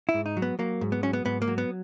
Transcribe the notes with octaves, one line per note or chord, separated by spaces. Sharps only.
E4
G#2
D#4
F#3
B3
F#3 A#3
G#2
B3
F#3 C#4
B3
G#2 B3
A#3
F#3
B3